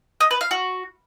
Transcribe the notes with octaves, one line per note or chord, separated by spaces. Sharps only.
D#5
B4
F5
F#4